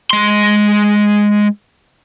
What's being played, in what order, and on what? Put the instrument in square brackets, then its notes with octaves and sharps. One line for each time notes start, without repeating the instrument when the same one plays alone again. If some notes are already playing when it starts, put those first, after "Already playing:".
[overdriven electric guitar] G#3 C6